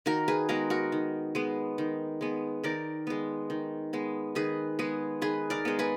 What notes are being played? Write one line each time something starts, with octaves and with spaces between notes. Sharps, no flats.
D#3 F#4 A#4
G#4 B4
G#3 B3 F#4 A#4
F#4 A#4
D#3
G#3 B3
D#3
G#3 B3
D#3 A#4 D5
G#3 B3
D#3
G#3 B3
D#3 G#4 B4
G#3 B3 G#4 B4
D#3 G#4 B4
A#4 D5
G#3 B3
G#4 B4